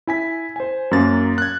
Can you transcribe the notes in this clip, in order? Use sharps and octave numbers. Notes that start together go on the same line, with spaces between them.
E4 G#5 B6
C5 G#5
F#2 A#3 A6
F#6 G#6